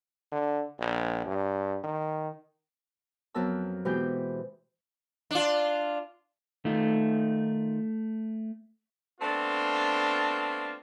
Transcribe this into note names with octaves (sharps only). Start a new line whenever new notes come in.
D3
A#1
G2
D#3
F2 F#3 B3 A#4 A5 E6
B2 E3 G#3 G4 C5 G6
D4 F4
D#3 A3 D#4 F4
A3 B3 C4 D4 F4